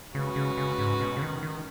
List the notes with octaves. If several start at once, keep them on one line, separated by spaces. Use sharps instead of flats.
C#3 G#3 C#4 F#4 B4
C#3
C#3
G#2
B2
C#3
D#3
D#3